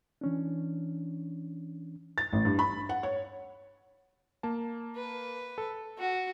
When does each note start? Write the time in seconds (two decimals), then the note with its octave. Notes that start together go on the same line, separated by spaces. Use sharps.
0.21 E3 C#4 D4
2.18 A6
2.33 A1
2.45 G2
2.59 B5
2.89 F#5
3.03 C#5
4.43 A#3 A5
4.96 B4
5.58 A4
5.98 F#4